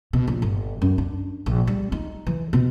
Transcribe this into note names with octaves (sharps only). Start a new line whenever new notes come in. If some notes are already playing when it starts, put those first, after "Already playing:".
B2
A#1
G1
F#2
D4
A#1
G3
D#4
E3
B2